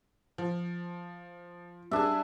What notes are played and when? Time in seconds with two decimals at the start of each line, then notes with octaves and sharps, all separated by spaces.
0.38 F3
1.91 G3 D4 G#4 E5